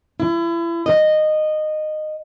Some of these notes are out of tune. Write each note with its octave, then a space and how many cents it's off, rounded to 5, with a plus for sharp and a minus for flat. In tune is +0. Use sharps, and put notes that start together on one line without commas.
E4 +35
D#5 -15